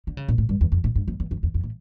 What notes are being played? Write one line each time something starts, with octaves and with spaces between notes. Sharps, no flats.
D3
C#3
A#2
A2
G2
E2
F2
A2
G2
F2
E2
F2
E2
F2
A2